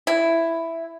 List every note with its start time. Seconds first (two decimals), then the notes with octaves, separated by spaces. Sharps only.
0.07 E4